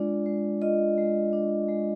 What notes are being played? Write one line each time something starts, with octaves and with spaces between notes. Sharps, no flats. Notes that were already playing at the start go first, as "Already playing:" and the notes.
Already playing: G#3 D4 F4 D5
G#3
F4 D#5
G#3
D4
G#3